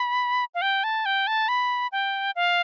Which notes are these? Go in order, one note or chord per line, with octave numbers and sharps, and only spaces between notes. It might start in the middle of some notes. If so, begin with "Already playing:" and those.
Already playing: B5
F5
G5
A5
G5
A5
B5
G5
F5